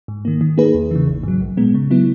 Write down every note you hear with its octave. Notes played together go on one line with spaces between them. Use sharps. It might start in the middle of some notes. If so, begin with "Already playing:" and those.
G#2
D#3 A#3
D#3
A#3 D#4 G#4 B4
E2
C#3 E3
G#1
G#2 F#3
A#1
A#2 G#3 B3
C#3
F#3 B3 E4